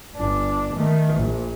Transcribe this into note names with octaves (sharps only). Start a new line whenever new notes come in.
G1 D4
D#3 A3
A#1